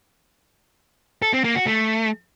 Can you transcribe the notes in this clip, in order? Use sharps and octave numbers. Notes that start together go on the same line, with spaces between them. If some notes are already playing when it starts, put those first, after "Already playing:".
A4
C4
A#3
F#4
A3